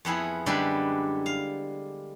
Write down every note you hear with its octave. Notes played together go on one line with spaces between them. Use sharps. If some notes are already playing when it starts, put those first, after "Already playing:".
F2 B3 E4 G#4
F#2 D3 G3 G#3 D4 B4
F5